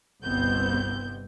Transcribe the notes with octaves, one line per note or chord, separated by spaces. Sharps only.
G1 C2 B2 B3 C4 G6